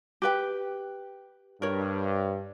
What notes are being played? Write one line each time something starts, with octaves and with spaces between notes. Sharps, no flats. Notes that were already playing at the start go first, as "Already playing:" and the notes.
G4 B4 G5
G2 A#4 C#5